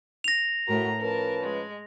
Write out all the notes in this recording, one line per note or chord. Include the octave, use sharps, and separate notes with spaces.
A#6 F7
A2 F#4 A#4 A#5
F3 C#4 A#4 B4 A5
G#3